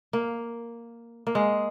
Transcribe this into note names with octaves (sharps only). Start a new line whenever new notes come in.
A#3
A#3
G#3